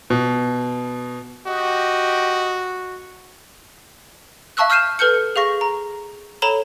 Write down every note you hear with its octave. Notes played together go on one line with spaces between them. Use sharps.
B2
F#4 G4 D#5
E5 F5 A5 C#6 E6 F#6
E6 F6 G6 C7 D#7 E7
A4 B4 F6 G6 C#7
G#4 F5 C#6 A#6
A#5
A4 C#5 A#5 B5 E7 G7